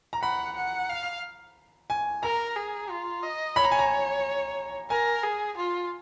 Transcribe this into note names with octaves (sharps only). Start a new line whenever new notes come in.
A#5
F#5 B5
F#5
F5
G#5
A#4 A#5
G#4
F4
D#5
C#5 B5
A#5
G#5
A#5
A#4 G#5
G#4
F4